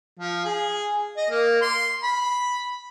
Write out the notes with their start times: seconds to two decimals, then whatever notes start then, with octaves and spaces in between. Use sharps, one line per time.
0.20 F3
0.45 G#4
1.17 D#5
1.30 A#3
1.62 C6
2.03 B5